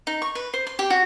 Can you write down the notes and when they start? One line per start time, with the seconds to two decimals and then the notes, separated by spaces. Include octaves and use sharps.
0.07 D#4
0.22 C#6
0.35 B4
0.54 C5
0.67 C6
0.79 G4
0.90 F#4